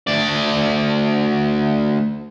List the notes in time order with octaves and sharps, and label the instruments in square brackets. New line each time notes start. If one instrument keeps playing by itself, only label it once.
[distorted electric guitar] D2 D5